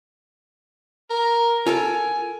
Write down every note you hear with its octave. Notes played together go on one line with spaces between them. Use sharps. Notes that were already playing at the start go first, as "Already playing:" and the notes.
A#4
F4 A4 A#4 G#5